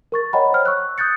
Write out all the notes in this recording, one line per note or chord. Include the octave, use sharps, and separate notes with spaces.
A#4 C#6 A6
C#5 D#5 F#5 G5 A#5 B5
C5 C#5 F6
C#6 E6 F#6
D#6 F#6 G6 A6 C#7